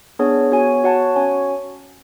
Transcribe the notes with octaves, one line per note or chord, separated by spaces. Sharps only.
B3 D4 G#4 C#5
B3 F#4 C#5 G#5
F#4 C#5 F#5 A5
C#4 F#4 C#5 G#5